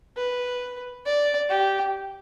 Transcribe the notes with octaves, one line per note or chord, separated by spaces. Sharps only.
B4
D5
G4